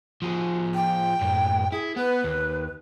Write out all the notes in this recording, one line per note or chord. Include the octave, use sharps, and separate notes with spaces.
F3 F#4 G#4
G5
F#2 A2
E4 G#4
B3 B4
D#2